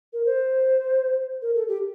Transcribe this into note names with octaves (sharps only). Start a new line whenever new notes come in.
A#4
C5
A#4
A4
G4